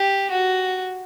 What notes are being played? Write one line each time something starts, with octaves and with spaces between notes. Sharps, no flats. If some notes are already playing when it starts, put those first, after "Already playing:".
Already playing: G4
F#4